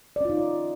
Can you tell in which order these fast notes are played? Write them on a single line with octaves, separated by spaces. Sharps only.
D5 C#4 F4 D#4